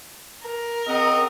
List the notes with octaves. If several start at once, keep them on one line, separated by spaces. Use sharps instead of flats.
A#4
C#3 C4 D#5 F#5